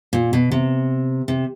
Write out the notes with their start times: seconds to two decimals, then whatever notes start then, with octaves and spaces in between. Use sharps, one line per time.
0.13 A#2
0.33 B2
0.52 C3
1.28 C3